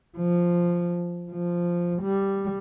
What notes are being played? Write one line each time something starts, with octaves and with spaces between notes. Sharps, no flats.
F3
F3
G3